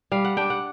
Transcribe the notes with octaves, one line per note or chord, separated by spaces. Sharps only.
G3 F5
F#5
D4 G5
F#5